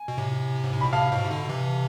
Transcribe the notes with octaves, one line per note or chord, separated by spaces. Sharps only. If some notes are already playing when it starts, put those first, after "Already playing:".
Already playing: G#5
B2
A2 C3
G#2
A2
B2 B5
A2 C3 F5 A5
G#2 B2
C3
B2 D3
C3 E3